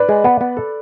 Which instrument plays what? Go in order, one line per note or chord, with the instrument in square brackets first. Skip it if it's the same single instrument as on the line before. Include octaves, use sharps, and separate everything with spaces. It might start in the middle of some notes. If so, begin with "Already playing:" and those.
Already playing: [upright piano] B4 D5
[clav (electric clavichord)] G#3
B3
B3
A4